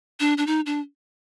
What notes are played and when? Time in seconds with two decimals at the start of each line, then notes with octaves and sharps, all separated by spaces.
0.20 D4
0.38 D4
0.47 D#4
0.66 D4